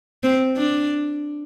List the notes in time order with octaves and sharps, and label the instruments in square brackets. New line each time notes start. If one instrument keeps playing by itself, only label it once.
[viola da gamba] C4
D4